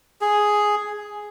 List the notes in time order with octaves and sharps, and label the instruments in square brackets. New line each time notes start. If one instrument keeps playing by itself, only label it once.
[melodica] G#4